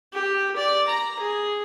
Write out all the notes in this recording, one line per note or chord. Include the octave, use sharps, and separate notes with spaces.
G4
D5
A#5
G#4